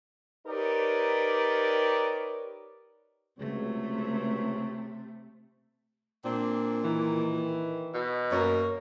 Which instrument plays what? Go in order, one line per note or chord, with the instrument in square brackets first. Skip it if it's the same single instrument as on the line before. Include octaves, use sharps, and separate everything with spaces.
[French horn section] D#4 G4 A#4 B4 C#5 D5
[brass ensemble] C#2 F#3 C#5 [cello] C3 A3
[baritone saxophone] A#2 [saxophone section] C4 D4
[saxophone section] D#3 E3
[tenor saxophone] B2
[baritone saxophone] F#2 [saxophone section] A#3 A#4 C#5